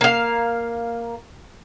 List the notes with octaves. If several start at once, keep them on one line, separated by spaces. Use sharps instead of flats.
A#3 F5